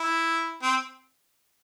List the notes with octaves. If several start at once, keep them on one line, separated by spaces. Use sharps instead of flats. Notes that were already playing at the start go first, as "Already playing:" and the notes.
Already playing: E4
C4